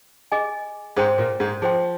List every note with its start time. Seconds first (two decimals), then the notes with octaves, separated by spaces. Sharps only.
0.32 G#4 D#5 G#5
0.96 G#2 G#3 G#4 C5 G5 C6
1.18 A#2 A#3
1.40 G#2 G#3
1.62 F3 G#4 C5 G5 C6